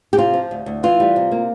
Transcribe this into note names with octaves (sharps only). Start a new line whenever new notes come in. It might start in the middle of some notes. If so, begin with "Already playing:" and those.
G4
C3 F4
F3
D2
D2
E3 F4
G3
C3
A#3